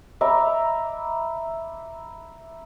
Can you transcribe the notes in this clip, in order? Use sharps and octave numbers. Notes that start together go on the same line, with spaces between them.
E5 A#5 B5 D6